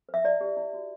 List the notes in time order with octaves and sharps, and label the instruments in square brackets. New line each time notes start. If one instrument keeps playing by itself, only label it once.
[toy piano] B4
E5
E4 D5
G4
E4
F#4